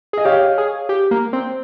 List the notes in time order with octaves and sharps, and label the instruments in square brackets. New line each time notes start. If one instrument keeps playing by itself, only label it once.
[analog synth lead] G#4 [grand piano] D#5
[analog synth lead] G4 [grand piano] C#5 F5
[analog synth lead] G#4
G4
A#3
C4